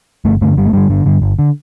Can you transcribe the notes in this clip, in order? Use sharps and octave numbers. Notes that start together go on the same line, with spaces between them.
G1 A3
G2 D3 A3
G1 G3
A3
G2 D3 G3
G1 D3
G2 D3
G1
D3